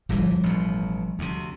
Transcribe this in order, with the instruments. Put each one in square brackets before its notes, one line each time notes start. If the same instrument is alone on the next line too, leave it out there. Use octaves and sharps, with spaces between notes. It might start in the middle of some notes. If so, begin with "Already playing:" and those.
[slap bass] D1 G1 A#2 [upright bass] F3 G3
[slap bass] A1 B2
D2 C3